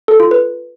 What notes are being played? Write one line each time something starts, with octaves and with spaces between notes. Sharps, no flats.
A4
F4
B4